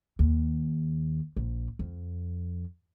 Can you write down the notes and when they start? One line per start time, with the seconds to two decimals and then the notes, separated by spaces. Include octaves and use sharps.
0.19 D#2
1.36 A#1
1.79 F2